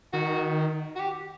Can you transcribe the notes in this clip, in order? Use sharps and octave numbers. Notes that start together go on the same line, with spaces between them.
D#3 F#4
F#4
G4